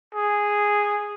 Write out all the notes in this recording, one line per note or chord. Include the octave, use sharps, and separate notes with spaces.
G#4